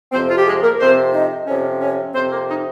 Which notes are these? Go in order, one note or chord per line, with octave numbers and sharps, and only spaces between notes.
F2 C3 F3 C4 C5
F4
G4
G#3 G#4
A#3 A#4
F2 C3 F3 C4 C5
D#4 D#5
F2 C3 F3 C#4 C#5
C#4 C#5
F2 C3 F3 C4 C5
A#3 A#4
D#4